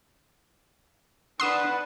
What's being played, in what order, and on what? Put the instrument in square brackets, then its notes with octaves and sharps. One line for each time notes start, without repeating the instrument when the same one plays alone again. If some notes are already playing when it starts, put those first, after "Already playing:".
[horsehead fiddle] D4 B4 [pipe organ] F#5 [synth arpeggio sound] C6 D#6 E7